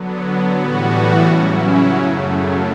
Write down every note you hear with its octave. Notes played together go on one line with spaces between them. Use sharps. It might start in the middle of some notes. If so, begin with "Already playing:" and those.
Already playing: D3 F#3 B3
A2 E3 G3 B3 F#4
C#3 F#3 C#4 E4
F#2 C#3 F#3 A3